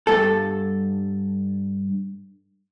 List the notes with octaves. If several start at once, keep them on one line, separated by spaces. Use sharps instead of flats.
G2 A4